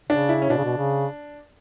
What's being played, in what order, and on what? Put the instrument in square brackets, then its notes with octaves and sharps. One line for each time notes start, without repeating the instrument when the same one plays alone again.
[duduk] C#3 [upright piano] D4
[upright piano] E4
C#4
[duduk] B2 [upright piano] D4
[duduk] C#3
B2
C#3